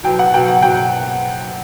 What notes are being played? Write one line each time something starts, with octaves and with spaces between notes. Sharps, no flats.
B2 F#3 G5
F#5
B2 F#3 G5
F#5
B2 F#3 G5